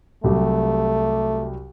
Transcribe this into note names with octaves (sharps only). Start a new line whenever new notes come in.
C2 F#3 A3 G4